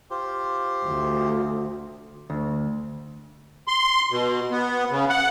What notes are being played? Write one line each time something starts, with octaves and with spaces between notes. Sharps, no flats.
F4 G4 C5
D2
D2
C6
B2
B3
C#3
F#5